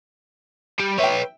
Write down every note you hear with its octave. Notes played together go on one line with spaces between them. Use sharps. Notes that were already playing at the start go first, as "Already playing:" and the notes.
G3
B4 C#5 E5 G5